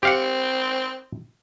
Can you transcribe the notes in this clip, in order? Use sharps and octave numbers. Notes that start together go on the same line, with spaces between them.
C4 G4 F5 F#5